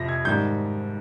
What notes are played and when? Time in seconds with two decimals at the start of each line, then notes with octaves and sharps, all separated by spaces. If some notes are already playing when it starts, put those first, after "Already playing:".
Already playing: F2 C3 F3 A#6
0.09 G#6
0.25 G#2 D#3 G3 G6